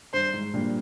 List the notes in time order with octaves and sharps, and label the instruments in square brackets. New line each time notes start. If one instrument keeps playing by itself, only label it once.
[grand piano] G2 [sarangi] C5
[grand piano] G#2
G2 A#2